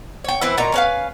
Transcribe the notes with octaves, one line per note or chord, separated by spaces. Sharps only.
C#5 G5
E3 C4 E4 B4
A#2 F#3 D#4 A#5
C#4 B4 F5